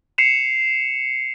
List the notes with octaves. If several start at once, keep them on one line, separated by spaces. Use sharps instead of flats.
C7 C#7 E7 F7